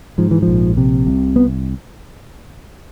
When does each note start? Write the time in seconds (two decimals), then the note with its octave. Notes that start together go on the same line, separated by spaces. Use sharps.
0.18 G#2 F3
0.31 E3
0.42 F3
0.48 A#1
0.77 C3
1.07 C2
1.36 B3